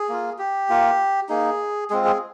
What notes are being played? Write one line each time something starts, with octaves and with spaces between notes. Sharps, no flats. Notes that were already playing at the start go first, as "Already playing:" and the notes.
Already playing: G#4
A#3 F4
G4
A#3 F4
A#3 D#4 G#4
G#3 C4 F4 G#4
G#4